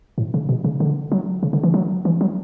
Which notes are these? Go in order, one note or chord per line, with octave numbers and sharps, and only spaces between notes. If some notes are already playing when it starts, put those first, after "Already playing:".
A2
C#3
B2
C#3
D3
F#3
C#3
D3
E3
F#3
E3
F#3